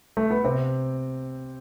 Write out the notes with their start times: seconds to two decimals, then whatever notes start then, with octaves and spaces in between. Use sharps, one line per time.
0.17 A3
0.31 B3
0.44 C3 C4